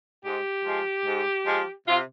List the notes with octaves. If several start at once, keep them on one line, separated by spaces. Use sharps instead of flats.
G#2 G4
F3 G#3
G#2
F3 G#3
C3 F4